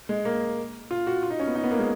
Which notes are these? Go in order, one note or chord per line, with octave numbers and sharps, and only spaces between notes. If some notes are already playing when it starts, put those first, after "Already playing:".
G#3
A#3
F4
F#4
F4
D#4
C#4
B3
D#4
B3
A#3
G#3